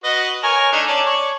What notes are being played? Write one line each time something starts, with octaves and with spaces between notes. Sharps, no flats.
F#4 B4 D#5
A#4 C#5 G#5
A3 D4 D#4
C#4 D5 A5
C#5 D5